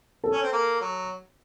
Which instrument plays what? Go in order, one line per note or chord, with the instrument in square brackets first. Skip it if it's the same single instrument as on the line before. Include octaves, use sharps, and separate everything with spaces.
[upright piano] A4
[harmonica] C#4
C4
A#3
F#3